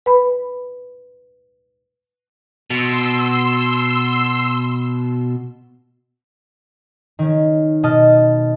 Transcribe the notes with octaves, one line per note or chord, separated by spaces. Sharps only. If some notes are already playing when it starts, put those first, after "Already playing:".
B4 B5
B2 C6 E6
D#3 C#4
B2 D#5 A5 F6